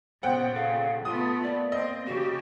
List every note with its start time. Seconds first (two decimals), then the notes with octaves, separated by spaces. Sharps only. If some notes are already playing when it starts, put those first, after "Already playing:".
0.23 A#2 C#3 B3 C5 F#5 G5
0.55 A4 F5
1.05 A3 B3 F4 D#6
1.43 A#3 D5
1.72 C4 D#5
2.07 C#3 F#4 G4